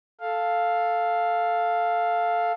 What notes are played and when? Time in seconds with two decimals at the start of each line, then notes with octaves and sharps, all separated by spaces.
0.21 A4 F5